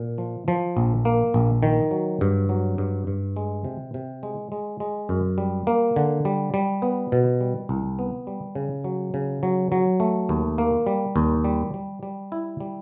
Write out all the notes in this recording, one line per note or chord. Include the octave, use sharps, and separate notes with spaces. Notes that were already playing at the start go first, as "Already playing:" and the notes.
Already playing: A#2
F3
F3
A#1
A#3
A#1
D#3
F#3
G2
F#3
G2
G2
G#3
C3
C3
G#3
G#3
G#3
F#2
G3
A#3
D3
G3
G3
B3
B2
G3
C2
B3
G3
C#3
F#3
C#3
F#3
F#3
A3
D#2
A#3
G3
D#2
G3
G3
G3
E4
G3